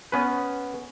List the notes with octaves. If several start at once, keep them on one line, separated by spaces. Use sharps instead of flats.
B3 C#4 B4